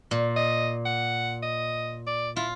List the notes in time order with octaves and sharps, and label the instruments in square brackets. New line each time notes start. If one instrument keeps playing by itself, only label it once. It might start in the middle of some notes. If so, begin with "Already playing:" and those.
[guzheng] A#2
[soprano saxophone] D#5
F#5
D#5
D5
[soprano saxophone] E4 [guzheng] F4